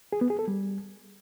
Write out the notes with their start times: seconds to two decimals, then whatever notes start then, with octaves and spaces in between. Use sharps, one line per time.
0.13 G#4
0.21 B3
0.30 G#4
0.39 A4
0.48 G3